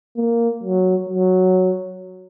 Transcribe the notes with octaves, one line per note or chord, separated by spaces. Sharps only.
A#3
F#3
F#3